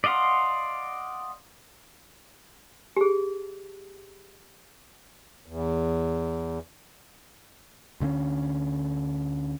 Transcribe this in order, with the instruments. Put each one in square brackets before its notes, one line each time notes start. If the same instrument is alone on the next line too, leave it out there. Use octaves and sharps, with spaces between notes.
[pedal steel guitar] D5 D#5 F5 F#5 C6
[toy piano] G4 G#4
[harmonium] E2
[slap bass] D2 D3 A3 C#4